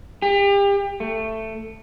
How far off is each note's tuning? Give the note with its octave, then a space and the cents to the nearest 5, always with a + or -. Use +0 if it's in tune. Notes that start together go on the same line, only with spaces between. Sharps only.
G4 +35
A3 +10